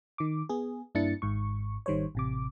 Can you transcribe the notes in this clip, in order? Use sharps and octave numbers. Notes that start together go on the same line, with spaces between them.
D#3 D6
B3 G#4
G2 A#3 D4 E4 A6 C#7
G#1 G#2 C#6
G#1 D#3 G3 C5 C#5
A1 C3 D6